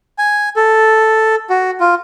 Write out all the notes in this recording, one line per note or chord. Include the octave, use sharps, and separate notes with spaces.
G#5
A4
F#4
F4